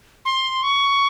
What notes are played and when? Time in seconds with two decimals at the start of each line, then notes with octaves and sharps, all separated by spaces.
0.25 C6
0.63 C#6